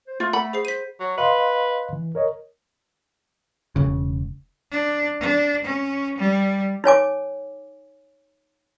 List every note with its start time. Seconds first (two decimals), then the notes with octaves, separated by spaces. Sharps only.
0.07 C5
0.20 A3 F4
0.33 F#5 B5
0.53 G#4 C5 C7
0.65 C5 B6 D#7
1.00 F#3
1.18 B4 D#5 F5 C6
1.93 E3
2.15 A#4 C#5 D#5
3.76 E1 C#3
4.71 D4
5.21 D4
5.64 C#4
6.18 G3
6.84 D#4 C#5 G#5 D6